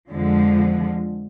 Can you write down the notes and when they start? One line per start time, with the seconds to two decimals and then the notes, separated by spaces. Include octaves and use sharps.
0.10 F2 D3 F3 G#3